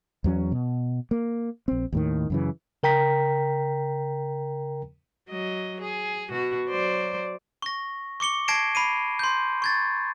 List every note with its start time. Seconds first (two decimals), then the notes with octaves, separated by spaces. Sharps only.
0.24 E2 F#3 C#4
0.52 B2
1.11 A#3
1.68 A#1 C4
1.92 D#2 A2 D#3
2.30 F#2 C#3 E3
2.83 C#3 A#4 G5 A#5 B6
5.29 F#3 D#5
5.81 G#4
6.30 B2 F#4
6.69 F#3 C5 D5
7.62 C#6 A#6
8.20 C#6 D6 C#7 G7
8.48 A5 G#6 A#6 C7 D7 E7
8.75 B5 C7 D#7
9.19 C6 G6
9.62 C#6 G#6 A6